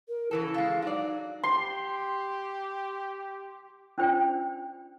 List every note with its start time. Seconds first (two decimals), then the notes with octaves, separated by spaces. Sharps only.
0.08 A#4
0.31 C#3 E3 E4 A4
0.54 G#3 A4 F5
0.82 F#3 D#4 D5
1.43 G4 C6
3.98 C#4 D4 F4 C5 D5 G5